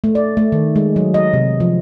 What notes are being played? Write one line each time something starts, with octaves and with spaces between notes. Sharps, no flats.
A3
D5
A3
D#3
G#3
F#3
D#5
C3
F3